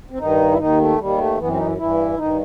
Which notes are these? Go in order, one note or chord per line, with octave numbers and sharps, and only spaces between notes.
C4
G2 D#3 D#4
E4
D#2 D#3 D#4
A3
D#2 D#3 G3
A3
F#2 E3 B3
C4
D#4
E4
G2 E3 E4
G2 D#3 D#4